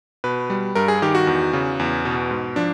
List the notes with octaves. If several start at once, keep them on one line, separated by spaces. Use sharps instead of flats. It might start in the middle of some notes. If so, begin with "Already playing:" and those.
B2 B4
G3
G2 A#4
G#4
D#3 G4
F#4
E2
C#3
E2
B2
G#2
F3 D4